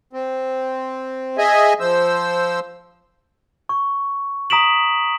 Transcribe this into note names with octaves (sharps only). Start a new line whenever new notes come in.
C4
G#4 D#5 E5 G#5
F3 C5 E6
C#6
A#5 D#6 B6 D7 E7 F#7